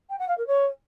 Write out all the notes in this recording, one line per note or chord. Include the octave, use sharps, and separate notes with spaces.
G5
F#5
F5
A#4
C#5